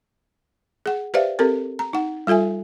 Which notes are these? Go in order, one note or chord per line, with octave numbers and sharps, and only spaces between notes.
G#4 F#5
G4 B4 C5 D5 E5 F5
C4 G4 A4 A#4
A#5
D#4 F#5
G3 F4 A4 E5 G#5